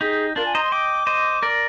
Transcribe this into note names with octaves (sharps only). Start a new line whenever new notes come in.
D#4 G4 G#4
D4 F4 A#4
G#5
C5 D#5 A#5
C6
D#5 G5 D6
C5 D#5
A#4 D5